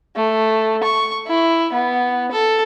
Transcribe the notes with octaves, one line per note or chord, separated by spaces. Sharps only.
A3
C#6
E4
B3
A4